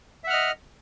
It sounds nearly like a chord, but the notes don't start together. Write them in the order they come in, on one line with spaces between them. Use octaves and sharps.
E5 F#5 F6 D#5